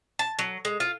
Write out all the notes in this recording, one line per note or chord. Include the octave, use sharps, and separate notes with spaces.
A5
F#3
G#3
F4